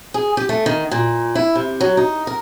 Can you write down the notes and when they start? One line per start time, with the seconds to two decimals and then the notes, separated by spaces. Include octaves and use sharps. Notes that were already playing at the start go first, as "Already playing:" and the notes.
0.14 G#4
0.37 G4
0.49 A3
0.66 D#3
0.91 A#2
1.35 E4
1.56 C3
1.81 F#3
1.97 D#4
2.27 A#4